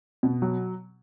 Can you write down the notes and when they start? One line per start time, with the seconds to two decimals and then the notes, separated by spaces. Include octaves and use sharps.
0.23 B2
0.42 F#3